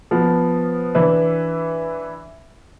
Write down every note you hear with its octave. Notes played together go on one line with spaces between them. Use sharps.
F3 B3
E3 D4 B4 E5